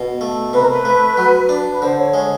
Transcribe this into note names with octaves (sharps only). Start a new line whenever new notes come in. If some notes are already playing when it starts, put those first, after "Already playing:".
Already playing: B2
A3
C3 B4
A#4
B4
A3
F#3
D4
B4
D3 C5
C#5
G#3 C#5